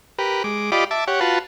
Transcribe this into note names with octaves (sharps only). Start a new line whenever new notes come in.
G4 A#4 B4
G#3 D6
F4 G4 D5 D#5 B5 D6
E5 A5 D6
G4 C#5 F#5
F4 F#4 B4 A5